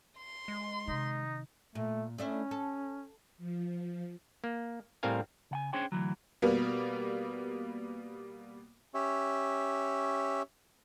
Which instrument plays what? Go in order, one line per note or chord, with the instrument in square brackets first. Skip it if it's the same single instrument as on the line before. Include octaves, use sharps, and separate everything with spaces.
[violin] C6
[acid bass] G#3
[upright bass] C3 D#3 [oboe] D#4
[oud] A#2 [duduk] A3
[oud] A3 D4 E4 [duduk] C#4
[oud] A4
[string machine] F3
[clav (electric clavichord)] A#3
A2 G3 C4 A#4 F5 G#5
[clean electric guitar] C#3 F#5 G#5
C#4 D4 G#4 C5 C#5 G5
D2 D#3 E3 F#3
[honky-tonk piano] B2 G3 A#3 B3
[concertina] C#4 G4 C#5 E5